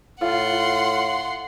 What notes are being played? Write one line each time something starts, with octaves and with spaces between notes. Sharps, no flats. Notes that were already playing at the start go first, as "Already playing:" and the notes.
A2 F4 F#5 C6